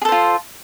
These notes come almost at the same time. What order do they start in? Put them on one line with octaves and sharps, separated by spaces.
G#4 A4 C5 F4